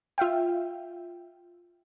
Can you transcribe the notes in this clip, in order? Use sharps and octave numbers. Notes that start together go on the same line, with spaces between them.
F4 E5 F5 G5